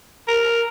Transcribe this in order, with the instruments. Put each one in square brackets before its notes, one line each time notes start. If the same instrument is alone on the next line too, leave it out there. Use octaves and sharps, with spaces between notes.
[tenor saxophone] A#4